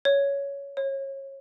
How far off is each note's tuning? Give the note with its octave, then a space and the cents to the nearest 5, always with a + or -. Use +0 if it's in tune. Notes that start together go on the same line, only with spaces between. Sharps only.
C#5 +15
C#5 -30